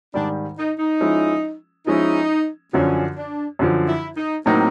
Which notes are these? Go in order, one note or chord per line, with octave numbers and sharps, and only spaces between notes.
G#2 D#3 G3 D4
D#4
D#4
F3 G#3 C#4 E4
F3 G#3 C#4 D#4 E4
F#2 D3 F3 C#4
D4
F#2 D3 F3
E4
D#4
A2 F#3 A#3 C4 D#4